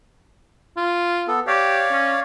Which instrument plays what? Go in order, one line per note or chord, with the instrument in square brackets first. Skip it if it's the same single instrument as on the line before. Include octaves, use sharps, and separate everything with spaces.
[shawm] F4
[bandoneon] B3 A4
[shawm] G4 [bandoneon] C#5 D5 F5
[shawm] C#4